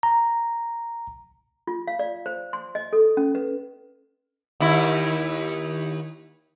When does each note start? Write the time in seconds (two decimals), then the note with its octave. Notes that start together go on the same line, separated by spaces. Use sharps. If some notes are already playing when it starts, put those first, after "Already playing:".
0.03 A#5
1.67 F4
1.88 F5
1.99 D5
2.26 C5
2.53 C6
2.75 D#5
2.93 A4
3.17 C#4
3.35 B4
4.60 D#2 E4